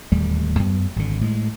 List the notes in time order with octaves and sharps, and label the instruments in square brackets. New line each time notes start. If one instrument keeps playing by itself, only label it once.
[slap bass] D1 D#2 G3 A3
F#2 B3
G#1 D3
A2 G3 G#3